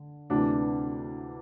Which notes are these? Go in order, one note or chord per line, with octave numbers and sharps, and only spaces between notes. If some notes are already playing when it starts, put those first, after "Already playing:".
Already playing: D3
D2 C3 E3 D4